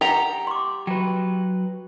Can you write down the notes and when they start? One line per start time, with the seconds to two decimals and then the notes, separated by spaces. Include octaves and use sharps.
0.01 G4 F#5 G5 A#5
0.47 C6 D6
0.87 F#3 B4 G5